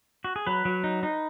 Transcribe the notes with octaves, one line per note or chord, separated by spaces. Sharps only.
F#4
G#4
F#3 B4
F#3
D#4
D#4